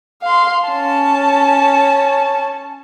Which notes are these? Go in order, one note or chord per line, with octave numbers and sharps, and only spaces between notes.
F5 C6
C#4 A5